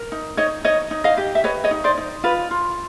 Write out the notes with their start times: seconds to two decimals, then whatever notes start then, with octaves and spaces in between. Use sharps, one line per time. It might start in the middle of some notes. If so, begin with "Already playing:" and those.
Already playing: A#4
0.12 D#4
0.37 D#4 C#5 D#5
0.65 D#4 C#5 D#5
0.91 D#4
1.04 D#5 F5
1.17 G4
1.35 E5
1.44 B4 C#5 D#5
1.64 C#5 D#5
1.71 D#4
1.84 C5 D5
1.98 D#4
2.24 F4 B4
2.51 F4